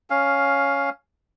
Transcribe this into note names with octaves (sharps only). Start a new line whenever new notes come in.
C#4 F5